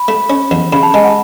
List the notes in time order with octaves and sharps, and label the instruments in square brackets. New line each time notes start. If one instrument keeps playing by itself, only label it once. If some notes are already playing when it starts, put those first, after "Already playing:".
Already playing: [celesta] B5
[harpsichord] A3
C#4
E2
[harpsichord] C#3 [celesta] B5
[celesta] A5
[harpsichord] G#3 [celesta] G#5
[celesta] F#5